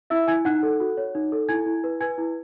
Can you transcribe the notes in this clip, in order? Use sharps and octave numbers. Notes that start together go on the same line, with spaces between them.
E4 E5 E6
E4 G#5 G#6
D#4 F#5 F#6
A4
F#4
C#5
D#4
A4
E4 G#5 G#6
E4
B4
B4 G#5 G#6
E4